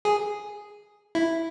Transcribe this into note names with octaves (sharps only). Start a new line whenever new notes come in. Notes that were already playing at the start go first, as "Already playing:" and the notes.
G#4
E4